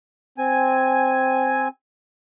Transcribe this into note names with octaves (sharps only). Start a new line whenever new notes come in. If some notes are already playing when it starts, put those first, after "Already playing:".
C4 G#5